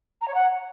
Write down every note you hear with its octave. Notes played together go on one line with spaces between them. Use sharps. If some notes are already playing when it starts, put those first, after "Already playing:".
A#5
C#5
F#5